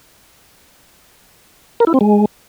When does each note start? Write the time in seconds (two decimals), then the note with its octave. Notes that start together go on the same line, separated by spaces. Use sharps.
1.80 A#4
1.87 E4
1.94 C4
2.01 G#3